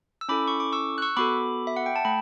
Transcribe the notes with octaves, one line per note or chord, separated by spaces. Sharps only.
E6
C#4 E4 A4 B5 D6
C#6
D6
C#6 E6
F#6
C#6 E6
B3 F#4 A4 B5 D6
E5
F#5
G5
A5
A3 G5 B5